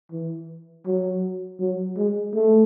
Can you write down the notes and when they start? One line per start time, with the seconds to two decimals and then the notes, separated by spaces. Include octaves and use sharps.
0.12 E3
0.87 F#3
1.60 F#3
1.97 G#3
2.34 A3